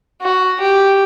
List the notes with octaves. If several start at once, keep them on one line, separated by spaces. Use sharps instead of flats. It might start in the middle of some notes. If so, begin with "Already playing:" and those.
F#4
G4